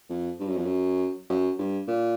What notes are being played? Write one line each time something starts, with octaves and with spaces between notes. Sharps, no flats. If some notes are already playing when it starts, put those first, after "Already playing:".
F2
G2
F#2
F2
F#2
F#2
G2
A#2